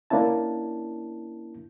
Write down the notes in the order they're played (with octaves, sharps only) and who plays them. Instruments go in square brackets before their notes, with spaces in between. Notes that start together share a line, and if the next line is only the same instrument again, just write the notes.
[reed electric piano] A#3 C#4 D4 E4 A5